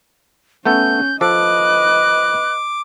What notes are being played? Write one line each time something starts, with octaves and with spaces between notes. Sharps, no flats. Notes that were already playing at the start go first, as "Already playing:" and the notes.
A3 B3 C#4 A4 G6
F3 A4 B4 D#5 D6 F#6